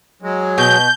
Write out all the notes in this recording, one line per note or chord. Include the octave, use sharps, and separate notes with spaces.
F#3 G#3
B2 G6